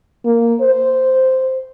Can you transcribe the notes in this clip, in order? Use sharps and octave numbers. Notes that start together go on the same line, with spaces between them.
A#3
C5